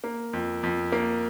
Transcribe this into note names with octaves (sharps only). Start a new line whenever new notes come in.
A#3
F2
F2
A#3